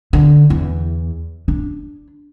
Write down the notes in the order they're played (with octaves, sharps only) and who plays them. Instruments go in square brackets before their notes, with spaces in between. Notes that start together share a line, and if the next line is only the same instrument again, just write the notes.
[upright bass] D3
E2
D4